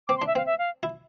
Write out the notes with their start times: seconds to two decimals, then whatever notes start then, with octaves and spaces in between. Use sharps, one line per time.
0.08 C4 D6
0.18 C6
0.22 D4
0.27 E5
0.35 C4 F5
0.46 E5
0.58 F5
0.83 E4